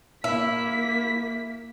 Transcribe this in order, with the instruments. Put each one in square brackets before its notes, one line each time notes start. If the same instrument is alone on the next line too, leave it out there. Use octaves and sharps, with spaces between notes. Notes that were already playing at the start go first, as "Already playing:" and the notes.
[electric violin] A#3 B6 [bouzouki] E4